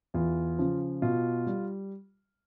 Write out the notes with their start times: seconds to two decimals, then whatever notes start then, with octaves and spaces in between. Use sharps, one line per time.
0.14 E2 F4
0.59 C#3 F3
1.02 B2 F4
1.47 G3